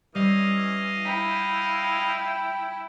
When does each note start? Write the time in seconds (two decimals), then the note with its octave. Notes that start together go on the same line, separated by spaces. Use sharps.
0.15 E3 G3 C#4 E4 D#5 F5
1.05 E4 G5 B6